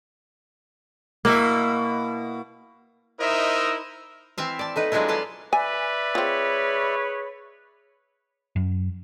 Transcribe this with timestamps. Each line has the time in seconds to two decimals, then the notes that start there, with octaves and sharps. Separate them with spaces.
1.25 B2 A#3 E4 E5
3.20 D#4 E4 A#4 C5 D#5 E5
4.38 E3 C4 E5 F5
4.59 D5 A5
4.76 A3 D#4 B4
4.92 F3 F#3 G#3 B3 D4 E4
5.08 A4 B4 F5 F#5 A5
5.53 B4 D5 E5 G#5
6.15 C4 F4 G#4 C#5 B5
8.56 F#2